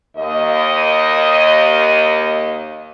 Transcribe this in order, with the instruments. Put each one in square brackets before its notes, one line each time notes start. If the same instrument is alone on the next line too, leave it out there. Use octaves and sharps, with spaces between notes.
[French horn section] D#2 D#5